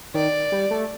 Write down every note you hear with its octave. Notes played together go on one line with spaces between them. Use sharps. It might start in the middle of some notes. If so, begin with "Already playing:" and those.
D#3 D5
G3
A3